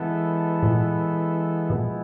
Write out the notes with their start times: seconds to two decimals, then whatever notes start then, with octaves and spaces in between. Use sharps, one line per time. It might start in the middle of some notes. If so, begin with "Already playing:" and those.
Already playing: E3 G#3 B3 E4 A4
0.63 A#2
1.70 B2 F3 G#3 B3 E4